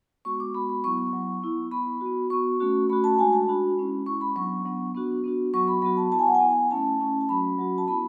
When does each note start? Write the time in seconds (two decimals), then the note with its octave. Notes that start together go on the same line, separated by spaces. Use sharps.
0.25 G#3 B3 F#4 C#6
0.40 D6
0.55 G#3 B3 F#4 B5
0.69 B5
0.84 F#3 B3 E4 C#6
0.98 C#6
1.13 F#3 B3 E4
1.43 B3 E4
1.71 B3 E4 B5
2.01 B3 F#4
2.30 B3 F#4 C#6
2.60 A3 C#4 F#4
2.89 A3 C#4 F#4 B5
3.04 A5
3.19 G#3 D4 F#4 G#5
3.33 A5
3.48 G#3 D4 F#4 B5
3.77 G#3 C#4 E4
4.06 G#3 C#4 E4 C#6
4.21 B5
4.36 F#3 B3 D4 C#6
4.65 F#3 B3 D4
4.95 B3 D4 F#4
5.24 B3 D4 F#4
5.53 F#3 B3 F#4 C#6
5.68 B5
5.82 F#3 B3 F#4 B5
5.97 A5
6.12 B3 E4 A5
6.19 G#5
6.27 F#5
6.34 G#5
6.41 B3 E4
6.71 A3 C#4 E4 A5
7.00 A3 C#4 E4
7.21 A5
7.29 F#3 C#4 F#4 B5
7.58 F#3 C#4 F#4
7.78 A5
7.88 B3 E4 B5